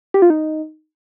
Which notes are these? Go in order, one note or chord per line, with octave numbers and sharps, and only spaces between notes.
G4
F4
D#4